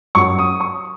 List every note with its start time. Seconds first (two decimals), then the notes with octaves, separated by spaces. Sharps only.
0.15 F#2 F#3 C#6
0.39 D#6
0.60 C#6